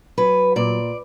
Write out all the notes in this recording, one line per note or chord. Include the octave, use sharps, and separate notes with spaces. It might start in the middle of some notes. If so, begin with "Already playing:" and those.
F#3 B4
A#2 D5